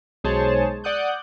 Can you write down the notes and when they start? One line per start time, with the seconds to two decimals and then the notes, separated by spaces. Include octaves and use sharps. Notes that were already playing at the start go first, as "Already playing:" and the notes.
0.24 B1 G#3 G#4 C5 C#5 A5
0.84 D5 F#5 D#6 F#6 G6